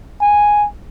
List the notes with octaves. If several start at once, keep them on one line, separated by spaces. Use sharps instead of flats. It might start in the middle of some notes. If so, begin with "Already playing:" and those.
G#5